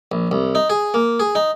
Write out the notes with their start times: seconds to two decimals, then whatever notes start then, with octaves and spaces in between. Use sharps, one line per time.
0.12 A#1
0.31 C2
0.55 D#4
0.70 G#4
0.94 A#3
1.20 G#4
1.35 D#4